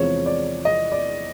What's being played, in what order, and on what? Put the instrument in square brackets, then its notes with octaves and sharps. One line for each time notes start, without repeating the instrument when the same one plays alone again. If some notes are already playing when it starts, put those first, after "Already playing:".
Already playing: [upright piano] E2 C3 F3 G#3 C#5
D5
D#5
D5